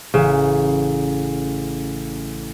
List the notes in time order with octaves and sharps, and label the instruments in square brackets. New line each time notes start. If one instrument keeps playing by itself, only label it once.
[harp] A1 B4 E7 [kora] C#3